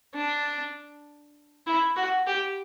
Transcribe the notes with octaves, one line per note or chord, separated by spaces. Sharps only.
D4
E4
F#4
G4